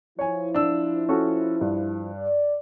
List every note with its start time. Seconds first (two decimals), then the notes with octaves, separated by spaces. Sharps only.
0.19 F3 E4 C#5 G#5
0.54 D4 E6
1.09 C#4 F#4 A4
1.61 G2
2.15 D5